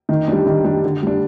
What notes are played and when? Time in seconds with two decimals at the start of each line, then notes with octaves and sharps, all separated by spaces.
0.09 D#3
0.28 G3 D4
0.47 D#3
0.64 G3 D4
0.84 D3
1.02 G3 D4